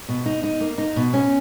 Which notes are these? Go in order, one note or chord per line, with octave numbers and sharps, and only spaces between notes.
B2
D#4
D#4
A#3
D#4
B2
C#4